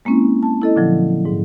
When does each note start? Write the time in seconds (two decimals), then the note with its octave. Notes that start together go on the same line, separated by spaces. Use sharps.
0.05 G#3 A#3 C4 C#4 E4
0.43 A5
0.62 E4 A4 D#5
0.76 A#2 D3 F3 F#3
1.25 G#2